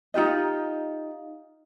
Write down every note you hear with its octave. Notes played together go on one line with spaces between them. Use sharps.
D#4 F4 G4 D#5